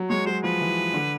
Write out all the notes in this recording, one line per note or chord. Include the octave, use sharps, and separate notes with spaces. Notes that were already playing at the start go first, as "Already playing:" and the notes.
Already playing: F#3
G#3 C#5
F#3 C5
F3 B4
E3
D3